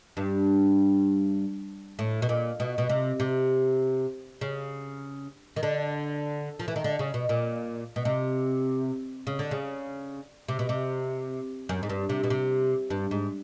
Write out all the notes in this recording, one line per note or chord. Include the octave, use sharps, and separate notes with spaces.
G2
A2
B2
A#2
B2
B2
C3
C3
C#3
D#3
D3
F3
E3
D#3
D3
C#3
B2
A#2
B2
C3
C#3
D3
C#3
C3
B2
C3
F#2
G#2
G2
C3
B2
C3
G2
G#2